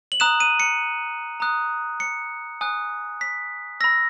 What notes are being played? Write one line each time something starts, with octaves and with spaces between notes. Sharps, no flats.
F#7
A#5 D#6 F#6 E7
D#7
C#7
A#5 D#6 F#6
C#7
G#5 D#6 F#6
B6
B5 E6 A#6